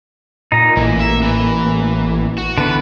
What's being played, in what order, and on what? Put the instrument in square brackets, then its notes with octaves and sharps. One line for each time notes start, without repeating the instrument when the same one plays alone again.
[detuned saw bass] A#2 [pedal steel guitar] D#4 A#5
[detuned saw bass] A1 [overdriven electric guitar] E3 [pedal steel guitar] A#3
[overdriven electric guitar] E5
E3
F#4
[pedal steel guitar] D3 E3 B3 [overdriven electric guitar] B4